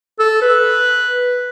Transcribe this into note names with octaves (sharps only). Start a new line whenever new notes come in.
A4
B4